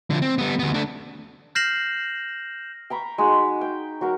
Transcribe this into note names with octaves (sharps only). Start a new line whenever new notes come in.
D3 F3
C4
G3 B3
D2 B3
A3 D4
F6 G6 A#6 C7 E7 F#7
G5 A#5 B5 C#6
G#3 D#4 F#4
G5
F#3 F#4 A#4